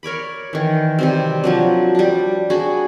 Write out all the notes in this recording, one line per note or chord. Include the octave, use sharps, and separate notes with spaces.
A#4 C#5 D5 B5
D#3 E3
C3 G3 C4
F3 F#3 D4
G3 D4
D4 F#4 G#4